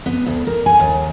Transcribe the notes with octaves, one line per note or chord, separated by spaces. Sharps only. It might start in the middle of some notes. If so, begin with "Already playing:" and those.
B3
D2
A#4
G#5
D#2